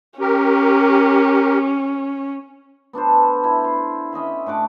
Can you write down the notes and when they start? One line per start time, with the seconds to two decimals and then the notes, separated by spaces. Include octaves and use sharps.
0.20 C#4 G4 A#4
2.93 B3 D4 A4 C5
3.44 E4
3.64 C6
4.13 C#4 D#5 E5 B5
4.46 A2 D4 F#5 D6